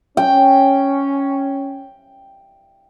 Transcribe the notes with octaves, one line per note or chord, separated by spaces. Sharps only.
C#4 G5